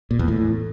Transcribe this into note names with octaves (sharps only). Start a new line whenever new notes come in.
A#2
E2
A2